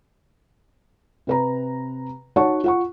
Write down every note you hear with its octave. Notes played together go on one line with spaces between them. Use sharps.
C3 B4 A#5
D#4 F#4 C#5 F#5 A5 C#6
F4 F#5 C#6